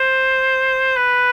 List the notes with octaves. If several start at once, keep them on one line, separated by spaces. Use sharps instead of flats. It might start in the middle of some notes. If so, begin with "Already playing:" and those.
Already playing: C5
B4